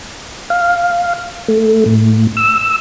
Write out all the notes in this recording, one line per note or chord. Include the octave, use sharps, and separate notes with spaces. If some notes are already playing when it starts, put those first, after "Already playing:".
F5
A3
A2
E6